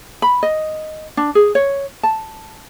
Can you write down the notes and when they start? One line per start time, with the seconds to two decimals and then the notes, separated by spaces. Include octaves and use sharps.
0.22 B5
0.43 D#5
1.17 D4
1.35 G#4
1.55 C#5
2.03 A5